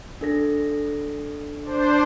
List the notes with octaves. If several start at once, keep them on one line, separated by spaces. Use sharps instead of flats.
D4 A4 A#6
D4 C5